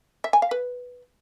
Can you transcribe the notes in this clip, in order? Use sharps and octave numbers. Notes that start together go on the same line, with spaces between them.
E5
G#5
F5
B4